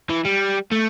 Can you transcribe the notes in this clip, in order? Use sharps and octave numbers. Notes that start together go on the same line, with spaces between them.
E3
G3
A3